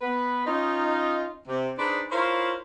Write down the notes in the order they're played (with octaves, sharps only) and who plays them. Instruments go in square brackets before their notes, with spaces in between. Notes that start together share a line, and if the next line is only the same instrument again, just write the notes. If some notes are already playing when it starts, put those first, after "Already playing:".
[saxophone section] B3 B4
C#4 D#4 F4
C3
D4 D#4 G#4 B4 C5 D5
E4 F4 A#4 C5 C#5 F5